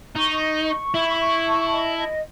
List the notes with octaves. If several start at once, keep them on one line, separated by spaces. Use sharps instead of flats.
D#4 C#6
C#6
C#6
E4 E5
C#6
A5
D#5
D#5